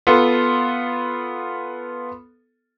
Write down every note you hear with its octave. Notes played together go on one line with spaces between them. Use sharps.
B3 F4 A4